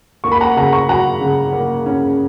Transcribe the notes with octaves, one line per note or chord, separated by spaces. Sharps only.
A#3 C#6
B5
F#5 A#5
C#3 F#5 A#5
A#5 C#6
F#3 F#5 A#5
C#3
A#3
C#4